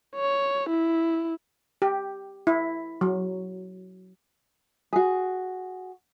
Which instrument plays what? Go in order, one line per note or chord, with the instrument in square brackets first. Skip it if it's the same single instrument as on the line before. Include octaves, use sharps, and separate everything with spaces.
[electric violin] C#5
E4
[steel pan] G4
E4
F#3
[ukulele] F#4 G#4